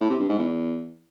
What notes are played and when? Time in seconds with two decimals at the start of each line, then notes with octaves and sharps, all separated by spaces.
0.01 A2
0.10 C3
0.20 G2
0.29 G#2
0.39 E2